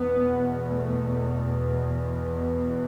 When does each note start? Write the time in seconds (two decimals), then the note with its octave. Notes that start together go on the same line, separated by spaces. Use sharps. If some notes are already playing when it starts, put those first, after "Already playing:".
Already playing: E2 B2 B3
0.70 A3
2.56 E3